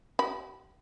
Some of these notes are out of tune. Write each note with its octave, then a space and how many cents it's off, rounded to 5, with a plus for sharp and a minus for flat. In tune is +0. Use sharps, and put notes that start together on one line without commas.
G4 -40 B5 +0